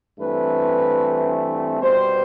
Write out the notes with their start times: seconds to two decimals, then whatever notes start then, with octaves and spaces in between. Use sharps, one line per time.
0.19 G2 E3 A3 C4 B4
1.81 B2 G3 B3 C5